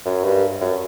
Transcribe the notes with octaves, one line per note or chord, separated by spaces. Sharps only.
F#2
G2
F#2